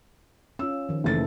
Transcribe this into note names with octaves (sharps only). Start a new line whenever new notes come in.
C#4 F4 E6
D#3 F3
F#1 E3 A3 A4 A6